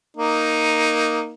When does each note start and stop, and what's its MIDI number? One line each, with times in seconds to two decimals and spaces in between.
0.17 1.32 58
0.17 1.32 63